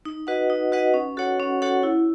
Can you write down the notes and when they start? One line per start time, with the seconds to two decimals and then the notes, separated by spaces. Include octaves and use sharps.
0.05 D#4
0.27 F#4 B4 D#5 F#5
0.50 D#4
0.72 F#4 B4 D#5 F#5
0.94 C#4
1.17 F#4 A4 C#5 F#5
1.40 C#4
1.62 F#4 A4 C#5 F#5
1.83 E4